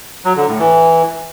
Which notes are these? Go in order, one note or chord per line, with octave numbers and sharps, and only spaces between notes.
F#3
D3
A2
E3